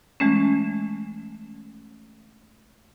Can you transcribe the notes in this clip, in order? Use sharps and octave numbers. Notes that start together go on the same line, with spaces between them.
E3 G#3 A3 C#4